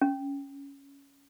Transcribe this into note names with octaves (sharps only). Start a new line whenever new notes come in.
C#4